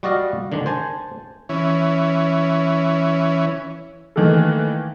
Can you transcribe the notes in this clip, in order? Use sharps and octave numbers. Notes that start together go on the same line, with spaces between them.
G3 F#4 D5 D#5 F5
D3 D#3 G#3 D4
C5 G#5 A5
E3 C#4
D#3 E3 A3 A#3 A4